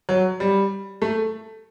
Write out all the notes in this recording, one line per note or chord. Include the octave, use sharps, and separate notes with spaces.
F#3
G3
A3